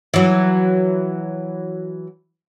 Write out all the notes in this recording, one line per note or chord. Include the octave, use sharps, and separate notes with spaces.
E3 F#3